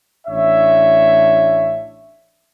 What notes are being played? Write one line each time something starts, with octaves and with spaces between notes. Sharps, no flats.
A1 D4 C#5 E5